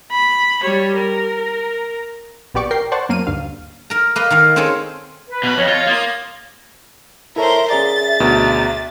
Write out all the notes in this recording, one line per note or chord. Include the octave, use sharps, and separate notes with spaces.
B5
G3 C#5
A#4
A#1 B3 G4 D5 C#6
A#4 G5 C7
C5 D5 F#5 A5 C#6
F#2 A#3 F6 D#7
D2 G2 F5
A#4 A#5
A#3 B4 D#5
D#3 A#4 F5
C4 C#4 D#4 G#4 A4 C#5
B4
B2 B5
F2 C#5 D#5
F4
A#3 C6 D#6
E4 A4 A#4 C5 C#5 E5
C#4 G#4 D5 E5 A6
D2 B2 A#5